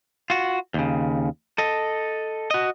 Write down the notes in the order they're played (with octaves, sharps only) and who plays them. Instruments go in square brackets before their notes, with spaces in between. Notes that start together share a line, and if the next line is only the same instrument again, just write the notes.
[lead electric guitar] F4 F#4
D#2 C#3
A4 D#5
F#4 D#5